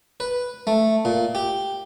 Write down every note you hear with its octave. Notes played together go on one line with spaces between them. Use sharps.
B4
A3
A#2
G4